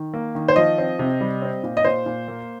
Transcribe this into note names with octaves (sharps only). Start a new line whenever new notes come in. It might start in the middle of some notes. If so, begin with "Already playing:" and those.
Already playing: D#3
A#3
D#3
C5
F3 D#5
C4
C3
G3
C4
A#2
D#5
A#2 C5
A#2
A#3